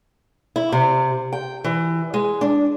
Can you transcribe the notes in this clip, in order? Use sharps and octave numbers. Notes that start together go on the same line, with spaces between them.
E4
C3
G5
E3
G#3
D4